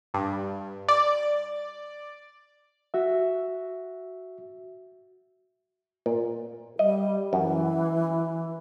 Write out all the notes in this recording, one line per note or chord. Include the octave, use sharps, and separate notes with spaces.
G2
D5
F#4 E5
A#2
G3 D#5
F#2 E3